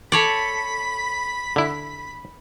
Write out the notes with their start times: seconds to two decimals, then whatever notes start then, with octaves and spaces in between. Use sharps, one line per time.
0.12 A4 C#5 D5 B5 B6
1.56 D3 E4